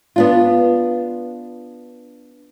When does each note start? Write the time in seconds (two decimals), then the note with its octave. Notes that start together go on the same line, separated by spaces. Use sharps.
0.16 B3 D4 F4